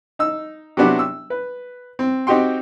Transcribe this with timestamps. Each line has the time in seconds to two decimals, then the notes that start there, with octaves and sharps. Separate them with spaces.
0.19 D#4 E6
0.77 C3 F#3 B3 D4 F#4 G4
0.99 E6
1.30 B4
1.99 C4
2.27 C4 D#4 F#4 G4 G5 C6